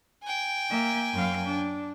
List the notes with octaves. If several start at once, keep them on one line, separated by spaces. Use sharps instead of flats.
G5 G#5
A#3 E5
F#2 F5
D4